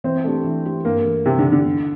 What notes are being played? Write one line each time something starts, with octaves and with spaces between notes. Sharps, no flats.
E3 C4
A3 D4 G4
E3
A3 D4 G4
G2 A#3
E3 A3
G2 C3
D3
E3 A3
D3
E2